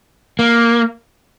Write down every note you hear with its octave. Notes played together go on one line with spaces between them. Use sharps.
A#3